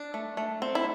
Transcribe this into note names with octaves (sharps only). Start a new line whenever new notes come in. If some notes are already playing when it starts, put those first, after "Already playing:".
Already playing: D4
A3
A3
C4
E4